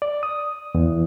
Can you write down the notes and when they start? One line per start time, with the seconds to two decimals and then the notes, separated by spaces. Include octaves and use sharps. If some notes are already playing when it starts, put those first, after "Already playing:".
0.02 D5
0.23 D#6
0.75 E2